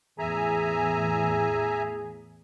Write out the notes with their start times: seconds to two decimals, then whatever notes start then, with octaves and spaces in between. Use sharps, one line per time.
0.19 E2 A2 G#4 E5 G#5 A#5